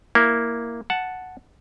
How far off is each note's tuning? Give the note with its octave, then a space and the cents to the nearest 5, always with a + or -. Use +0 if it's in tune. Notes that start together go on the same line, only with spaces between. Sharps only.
A#3 +0 E4 +0
F#5 +0 A5 +0